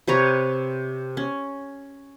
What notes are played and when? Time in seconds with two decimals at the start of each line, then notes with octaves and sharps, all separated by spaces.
0.07 C3 B4 C#5 A#5
1.17 C#4